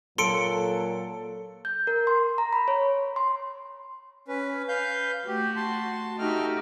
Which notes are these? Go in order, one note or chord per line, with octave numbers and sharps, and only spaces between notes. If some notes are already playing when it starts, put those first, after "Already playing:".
A#2 F#3 A4 C6 C#7 D7
G6
A#4
C6
A#5
B5
C#5
C6
C#4 B4
B4 F5 G6
A3 F#4 G4
A5 C6
A3 D#4 F#4 G4 F6